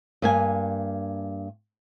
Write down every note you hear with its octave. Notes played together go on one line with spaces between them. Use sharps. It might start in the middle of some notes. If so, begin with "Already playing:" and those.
G2 A#3 G#5